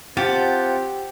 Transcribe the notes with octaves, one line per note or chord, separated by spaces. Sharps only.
C4 F4 G4 F#5 A5